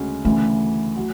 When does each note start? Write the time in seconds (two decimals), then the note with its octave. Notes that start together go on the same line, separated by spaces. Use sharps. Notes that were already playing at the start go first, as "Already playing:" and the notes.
Already playing: D2 C#3 G#3 C#4 F#4
0.25 D2 C#3 E3 A3
0.97 F#3